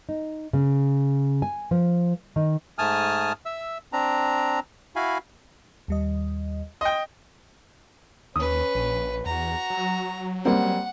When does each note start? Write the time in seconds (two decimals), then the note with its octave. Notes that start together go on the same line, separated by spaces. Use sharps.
0.09 D#4
0.53 C#3
1.42 G#5
1.71 F3
2.36 D#3
2.78 G#2 A3 G#5 A5 D#6 F6
3.46 E5 E6
3.93 C4 D4 A#5
4.96 E4 F#4 F5 G#5 B5
5.88 D#2 G3 D#5
6.81 D#5 G5 C6
8.36 D#2 C#4 B4 D#6
8.75 A#1
9.26 E2 F#4 A#5
9.70 F#3
10.45 G3 A#3 C4 F#5